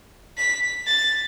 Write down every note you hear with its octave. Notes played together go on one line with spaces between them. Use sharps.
B6
A6